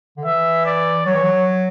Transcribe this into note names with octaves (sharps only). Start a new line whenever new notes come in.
D3
E3 E5
D5
F#3 C#5
E3
F#3